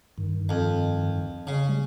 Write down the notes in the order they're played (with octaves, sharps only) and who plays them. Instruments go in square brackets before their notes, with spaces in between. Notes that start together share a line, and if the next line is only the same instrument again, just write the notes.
[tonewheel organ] G2 D#3
[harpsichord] F2
C#3
[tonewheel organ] G3 G#3